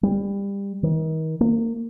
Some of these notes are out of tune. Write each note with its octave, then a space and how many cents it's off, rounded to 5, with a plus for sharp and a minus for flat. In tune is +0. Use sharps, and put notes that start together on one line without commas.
G3 +25
D#3 +35
A#3 -25